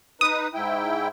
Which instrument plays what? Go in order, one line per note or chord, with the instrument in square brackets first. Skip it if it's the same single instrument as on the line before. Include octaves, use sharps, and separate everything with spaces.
[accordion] D#4 B4 [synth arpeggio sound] D#6
[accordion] G#2 E4 G5